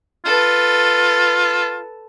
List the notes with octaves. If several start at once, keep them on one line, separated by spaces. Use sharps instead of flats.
F4 A4 B4